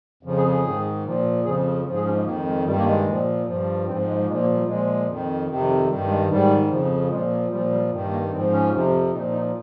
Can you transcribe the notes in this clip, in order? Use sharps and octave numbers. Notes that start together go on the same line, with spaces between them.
F2 C#3 F3
G#4
G#4
G#2 D#3
A#2 F3
F2 C#3 F3 G#4
G#2 F3
G#4
C#4
G#3
F2 D#3 A#3
G#3
G2 D#3 G3
A#3
G#3
A#2 F3
G2 F3
G#2 F3 C4
G#3
A#2 F3 G#3
A#3
G3
A#2 F3 G#3
F2 D#3
F2 C3 D#3
G2 D#3 G3
G#3
G#2 D#3 G3
F2 C#3 F3
A#2 F3 G#3
A#3
A#2 F3 G3
G3
G2 D#3
A#3
G#2 F3 C4
C#4
F2 C3 F3
A#2 F3 D#4
D#4